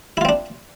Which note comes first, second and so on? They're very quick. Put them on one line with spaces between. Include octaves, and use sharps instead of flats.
E4 F4 C4 D4